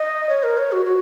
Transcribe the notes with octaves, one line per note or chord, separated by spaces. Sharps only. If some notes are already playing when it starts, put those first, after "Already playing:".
Already playing: D#5
C#5
A#4
C#5
F#4
F#4